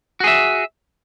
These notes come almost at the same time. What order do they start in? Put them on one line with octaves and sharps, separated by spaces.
F#4 G#4 E5